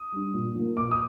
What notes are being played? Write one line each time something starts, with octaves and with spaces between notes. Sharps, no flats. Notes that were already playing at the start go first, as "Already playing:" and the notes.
Already playing: D#6
G3 D4
A#2
F3 A#3
A#2 D6
D#6